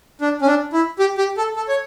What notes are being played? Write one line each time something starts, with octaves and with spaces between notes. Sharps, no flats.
D4
C#4
D4
E4
G4
G4
A4
A4
C#5